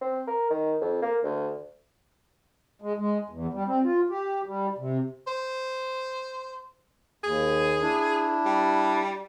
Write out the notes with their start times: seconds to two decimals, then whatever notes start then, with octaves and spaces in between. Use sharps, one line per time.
0.01 C4
0.27 A#4
0.50 D#3
0.81 F2
1.02 A#3
1.24 D2
2.82 G#3
2.98 G#3
3.30 E2
3.53 G3
3.67 C4
3.84 F4
4.10 G4
4.46 G3
4.78 C3
5.27 C5
7.24 D#2 G#4
7.81 D4 E4
8.45 G3